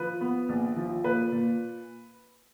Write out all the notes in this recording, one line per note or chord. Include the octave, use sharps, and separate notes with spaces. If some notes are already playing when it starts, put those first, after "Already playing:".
Already playing: F3 B4
B3
A#1
F3
A#2 B4
A#2